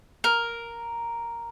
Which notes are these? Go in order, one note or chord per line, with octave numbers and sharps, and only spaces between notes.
A#4